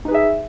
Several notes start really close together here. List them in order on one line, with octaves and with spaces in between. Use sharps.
D#4 B4 G#4 E5